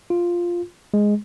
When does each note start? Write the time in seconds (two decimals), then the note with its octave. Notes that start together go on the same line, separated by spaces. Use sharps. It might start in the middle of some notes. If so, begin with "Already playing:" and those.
0.10 F4
0.94 G#3